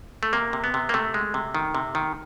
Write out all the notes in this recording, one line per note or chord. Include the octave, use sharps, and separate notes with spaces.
A3
C3 A#3
C3
B3
C3
A#3
C3 A3
G#3
C3
D#3
C3
D#3